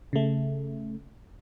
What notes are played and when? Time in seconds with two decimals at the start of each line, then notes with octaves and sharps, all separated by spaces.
0.13 C#3 A3